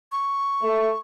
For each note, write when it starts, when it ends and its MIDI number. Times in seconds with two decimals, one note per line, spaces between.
0.12 0.99 85
0.63 0.89 57